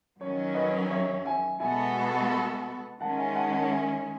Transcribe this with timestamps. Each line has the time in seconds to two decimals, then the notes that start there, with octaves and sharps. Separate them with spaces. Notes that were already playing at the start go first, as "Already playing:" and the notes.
0.20 F#2 D#3 F#3 C#4 C#5
0.55 B4 D#5
0.90 C#5 E5
1.25 E5 G#5
1.60 B2 G#3 B3 F#4 A4 E5 G#5
3.00 D#3 G#3 C#4 F#5 A5
3.18 E5 G#5
3.35 F#5 A5
3.52 F#5 A5
3.70 E5 G#5